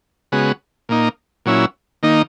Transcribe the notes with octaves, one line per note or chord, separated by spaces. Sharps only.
C#3 G#3 B3 F#4
A#2 A#3 D#4
A#2 F#3 C#4 E4
D#3 A#3 D#4